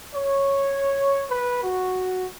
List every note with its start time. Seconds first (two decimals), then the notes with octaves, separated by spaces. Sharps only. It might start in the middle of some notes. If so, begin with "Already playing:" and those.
0.15 C#5
1.30 B4
1.64 F#4